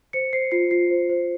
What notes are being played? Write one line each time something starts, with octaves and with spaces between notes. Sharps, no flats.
C5 C#7
C5 C7
F4 C7
F4 C7
C5
C5